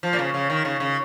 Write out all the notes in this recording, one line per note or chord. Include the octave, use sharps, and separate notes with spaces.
F3
A#2
C#3
C#3
D#3
C#3
C#3